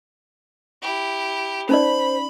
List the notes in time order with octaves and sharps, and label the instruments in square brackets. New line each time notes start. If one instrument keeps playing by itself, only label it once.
[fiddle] E4 G4
[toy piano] C#4 D#4 D5 [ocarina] C5 [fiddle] B5